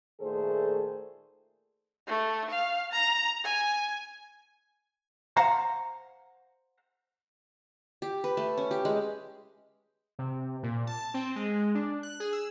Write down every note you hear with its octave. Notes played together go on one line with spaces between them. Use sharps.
A#2 D#3 A3 G#4 A4 C5
A3
F5
A#5
G#5
C5 F5 F#5 A#5
G4
B4
A3
C#4
G4
G#3
C3
A#2
A5
C4
G#3
D4
F#6
G#4
E6